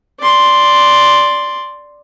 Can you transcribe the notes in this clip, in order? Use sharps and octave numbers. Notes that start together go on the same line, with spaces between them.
D5 C6